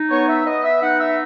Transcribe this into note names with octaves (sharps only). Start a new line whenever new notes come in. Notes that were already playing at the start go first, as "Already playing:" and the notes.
Already playing: D#4
B3 C#5
E5
B3 D#5
E5
D#4 F#5
E5